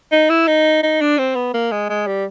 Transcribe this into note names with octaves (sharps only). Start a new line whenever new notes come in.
D#4
E4
D#4
D#4
D4
C4
B3
A#3
G#3
G#3
G3